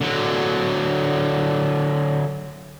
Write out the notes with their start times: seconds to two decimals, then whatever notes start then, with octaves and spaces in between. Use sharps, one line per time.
0.01 D3 F#3